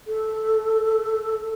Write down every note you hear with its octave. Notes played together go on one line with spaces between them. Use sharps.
A4